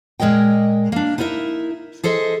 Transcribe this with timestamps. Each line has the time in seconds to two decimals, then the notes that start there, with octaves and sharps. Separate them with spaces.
0.20 A#2 G#3 A#4 D#5 G5
0.92 A#3 D4
1.18 D#4 E4 A#4 D5 E5
2.04 G#4 A4 C5 D#5 E5